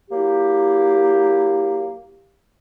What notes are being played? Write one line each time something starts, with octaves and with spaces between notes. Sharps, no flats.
F#3 A#3 E4 G4